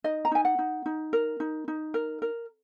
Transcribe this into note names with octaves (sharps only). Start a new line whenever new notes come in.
D#4 D#5
A#5
D#4 G#5
F#5
D#4
D#4
A#4
D#4
D#4
A#4
A#4